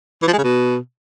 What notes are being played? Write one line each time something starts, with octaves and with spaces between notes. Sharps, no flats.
E3
F3
G#3
C#3
B2